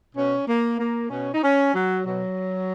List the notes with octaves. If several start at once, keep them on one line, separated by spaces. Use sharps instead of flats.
B2 C#4
A#3
A#3
B2 C#4
D#4
C#4
F#3
B2 F#3